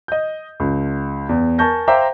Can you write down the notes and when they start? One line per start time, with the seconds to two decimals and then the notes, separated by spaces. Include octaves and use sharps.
0.08 D#5 G6
0.60 C#2
1.29 E2
1.59 A#4 G#5 A5 C#6 G6 A#6
1.88 C5 E5 F5 G5 A#5 D6